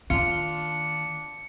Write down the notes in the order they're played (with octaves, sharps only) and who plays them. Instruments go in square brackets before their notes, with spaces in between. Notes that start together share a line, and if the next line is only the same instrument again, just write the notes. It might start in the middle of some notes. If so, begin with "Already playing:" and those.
[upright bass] D#3 A#3 [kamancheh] D4 [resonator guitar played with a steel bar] F4 [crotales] C#7